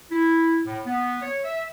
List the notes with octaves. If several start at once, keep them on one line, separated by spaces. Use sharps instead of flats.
E4
A2
B3
C#5
E5